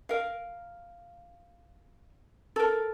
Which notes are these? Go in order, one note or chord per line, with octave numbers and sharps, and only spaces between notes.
A#4 F5
A4 A#4